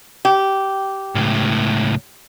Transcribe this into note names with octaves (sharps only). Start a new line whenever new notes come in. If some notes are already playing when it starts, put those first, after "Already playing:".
G4
C#2 A2